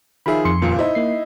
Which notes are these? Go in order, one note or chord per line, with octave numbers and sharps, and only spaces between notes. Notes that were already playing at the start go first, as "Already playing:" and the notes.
D#3 F3 G#4 E5 B5
F2 C6 C#7
D#1 C#2 A#2
D#4 E4 C5
A#3 C7